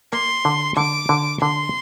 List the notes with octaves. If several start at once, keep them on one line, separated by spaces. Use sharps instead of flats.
A#3 C6
D3
D3 D6
D3
D3 C6